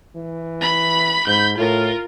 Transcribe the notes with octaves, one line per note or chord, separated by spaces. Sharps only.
E3
B5
G#2 B5 G6
A2 F4 A#4